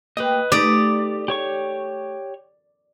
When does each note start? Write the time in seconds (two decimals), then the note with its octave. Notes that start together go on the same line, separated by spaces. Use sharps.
0.17 A#3 G4 B4 D#5
0.52 A3 D#4 G4 B4 D5 D#6
1.28 G4 C#5 C#6